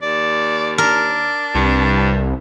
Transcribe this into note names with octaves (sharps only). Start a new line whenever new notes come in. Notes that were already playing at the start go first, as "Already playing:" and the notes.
D#2 D5
D4 A#4
C2 G2